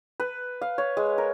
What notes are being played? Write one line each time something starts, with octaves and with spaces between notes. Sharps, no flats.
B4
F5
C#5
G#3
A#4